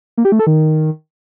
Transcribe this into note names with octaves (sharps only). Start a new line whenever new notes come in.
A#3
G4
A3
A4
D#3